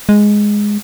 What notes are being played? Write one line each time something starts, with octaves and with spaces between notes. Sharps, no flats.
G#3